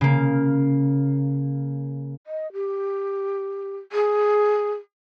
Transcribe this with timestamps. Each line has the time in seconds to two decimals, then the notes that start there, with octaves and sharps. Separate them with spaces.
0.01 C#3 A#3
2.27 D#5
2.53 G4
3.92 G#4